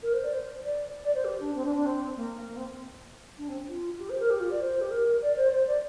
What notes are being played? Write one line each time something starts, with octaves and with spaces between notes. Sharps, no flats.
A#4
C5
D5
C5
D5
D5
C5
G4
D4
C4
D4
D4
C4
A#3
A#3
C4
D4
C4
F4
G4
C5
A#4
G4
F4
D5
C5
G4
A#4
D5
C5
C5
D5